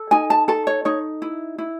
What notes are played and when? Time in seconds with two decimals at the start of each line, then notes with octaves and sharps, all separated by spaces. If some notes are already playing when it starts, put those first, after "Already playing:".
Already playing: A4
0.11 D#4 G#5
0.30 A5
0.48 A4 A5
0.67 C#5
0.85 D#4 C#5
1.22 E4
1.58 E4